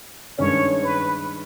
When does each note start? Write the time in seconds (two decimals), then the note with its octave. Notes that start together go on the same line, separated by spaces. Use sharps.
0.39 G2 D#3 G#3 C#4 C#5
0.83 B4